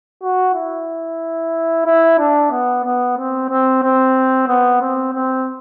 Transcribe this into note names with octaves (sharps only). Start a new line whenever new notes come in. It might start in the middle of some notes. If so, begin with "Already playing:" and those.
F#4
E4
E4
D4
B3
B3
C4
C4
C4
B3
C4
C4